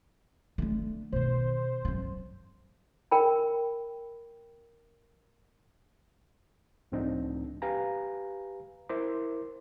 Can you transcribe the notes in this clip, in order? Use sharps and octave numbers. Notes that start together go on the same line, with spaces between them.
D3 A3
B2 D#3 C5
F#2 C#3
A#4 G5 B5
C#2 A2 F3 C4 D4 D#4
G4 B4 F5 G#5 A#5
E4 A#4 C5 C6 D6